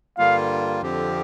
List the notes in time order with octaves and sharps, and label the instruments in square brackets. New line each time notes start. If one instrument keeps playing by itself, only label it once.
[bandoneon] G2 D3 G3 A#3 F4 [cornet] F5
[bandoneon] F2 D3 F3 C4 G4